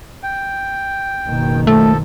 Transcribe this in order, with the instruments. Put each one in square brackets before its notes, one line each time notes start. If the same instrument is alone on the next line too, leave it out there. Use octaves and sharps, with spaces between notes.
[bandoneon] G5
[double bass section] F#1 B2 D#3
[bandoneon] F3 A4 [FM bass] A3